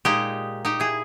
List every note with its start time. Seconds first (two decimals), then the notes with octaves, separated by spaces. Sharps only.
0.05 A#2 G#3 D#4 G4
0.65 D#4 G4
0.80 E4 G#4